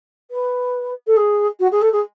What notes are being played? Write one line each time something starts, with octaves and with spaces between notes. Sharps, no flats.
B4
A4
G#4
F#4
G#4
A4
G#4